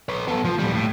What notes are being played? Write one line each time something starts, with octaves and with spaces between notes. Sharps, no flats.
B4 C#5
B3 A4
F3
A#2 G3
A2